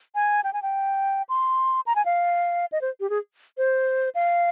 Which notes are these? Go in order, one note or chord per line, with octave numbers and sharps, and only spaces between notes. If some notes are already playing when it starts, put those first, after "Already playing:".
G#5
G5
G#5
G5
C6
A#5
G#5
F5
D#5
C5
G4
G#4
C5
F5